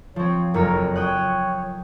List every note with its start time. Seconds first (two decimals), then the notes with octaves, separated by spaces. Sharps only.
0.16 F3 C4 C#5
0.54 F#1 F2 A#4 C#5
0.96 C#5 G5 D#6 F#6